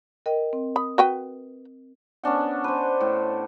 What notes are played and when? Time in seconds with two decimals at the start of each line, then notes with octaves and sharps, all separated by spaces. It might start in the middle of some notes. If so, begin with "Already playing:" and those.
0.26 A#4 D#5 G5
0.53 C4
0.76 B5 D#6
0.98 F#4 B4 G5
2.23 B3 C#4 D4 F#5
2.64 B4 C5
3.01 A2